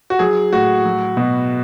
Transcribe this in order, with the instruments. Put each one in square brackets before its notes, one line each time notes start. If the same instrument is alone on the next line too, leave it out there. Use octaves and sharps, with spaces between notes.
[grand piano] F#4
F#3 G#4
A2 F#4
F#3
B2